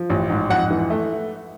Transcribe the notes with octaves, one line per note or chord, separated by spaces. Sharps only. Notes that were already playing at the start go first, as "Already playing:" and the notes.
Already playing: F3
A1
G#2
F2 F#5
E3
A3